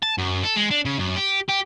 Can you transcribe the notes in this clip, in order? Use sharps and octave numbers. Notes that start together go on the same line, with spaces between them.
A5
F#2
A4
G#3
D4
C#3
F#2
G4
G4